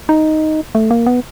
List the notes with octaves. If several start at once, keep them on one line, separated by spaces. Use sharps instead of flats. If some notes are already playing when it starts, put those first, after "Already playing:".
D#4
A3
A#3
B3